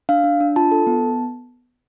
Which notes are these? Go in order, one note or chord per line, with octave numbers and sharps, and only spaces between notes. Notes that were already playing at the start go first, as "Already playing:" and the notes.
D4 F5
D4
D4
F4 A5
A4
B3